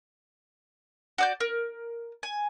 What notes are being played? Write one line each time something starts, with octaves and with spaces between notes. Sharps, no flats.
F#4 D5 G6
A#4
G#5